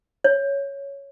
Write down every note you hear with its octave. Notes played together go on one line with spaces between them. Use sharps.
C#5